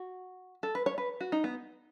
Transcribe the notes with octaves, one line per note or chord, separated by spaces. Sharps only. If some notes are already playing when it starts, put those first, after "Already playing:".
Already playing: F#4
A4
B4
C#5
B4
F#4
D#4
B3